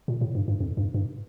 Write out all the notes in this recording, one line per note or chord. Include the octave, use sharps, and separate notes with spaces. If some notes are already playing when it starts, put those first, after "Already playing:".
A#2
A2
G2
G2
F2
G2
G2